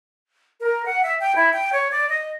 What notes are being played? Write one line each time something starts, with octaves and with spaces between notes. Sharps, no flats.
A#4
F#5
E5
G5
E4
G5
C#5
D5
D#5